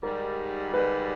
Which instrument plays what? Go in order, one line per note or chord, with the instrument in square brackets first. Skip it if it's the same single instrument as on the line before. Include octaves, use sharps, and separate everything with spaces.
[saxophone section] G#2 D#3 G3 [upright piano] A#4
[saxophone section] G#2 D#3 G3 [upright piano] B4